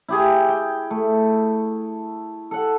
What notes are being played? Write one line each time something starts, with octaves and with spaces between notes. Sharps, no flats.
E4 G4 G#4
G5
A3
A4 F#5